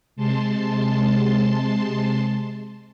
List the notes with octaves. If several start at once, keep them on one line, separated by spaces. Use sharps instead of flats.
C3 G#3 A5 C6